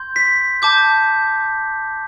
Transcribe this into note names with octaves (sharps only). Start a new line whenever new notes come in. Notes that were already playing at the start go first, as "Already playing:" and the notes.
Already playing: C6 G6
B6
A5 D6 G6